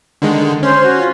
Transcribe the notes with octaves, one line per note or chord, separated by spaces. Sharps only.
D3 D#3 G#3
C#4 C5
F#4
F4